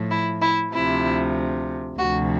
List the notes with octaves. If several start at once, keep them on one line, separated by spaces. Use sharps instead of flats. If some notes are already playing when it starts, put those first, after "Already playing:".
Already playing: A2 F3
E4
E4
D2 C3 F3 E4
D2 C3 F3 F#4